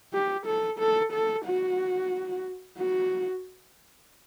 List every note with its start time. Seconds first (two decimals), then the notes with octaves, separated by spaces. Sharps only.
0.13 G4
0.46 A4
0.79 A4
1.13 A4
1.45 F#4
2.78 F#4